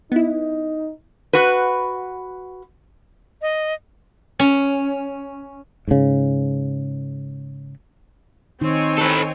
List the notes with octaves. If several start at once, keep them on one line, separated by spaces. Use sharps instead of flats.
B3 D#4 E4
F#4 B4
D#5
C#4
G#2 C#3
D#3 C4 D#4 C#5 G#5
A4 B4